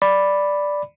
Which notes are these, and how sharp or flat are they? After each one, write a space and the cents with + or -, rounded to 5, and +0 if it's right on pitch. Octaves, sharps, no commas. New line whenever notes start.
D5 +0 B5 +0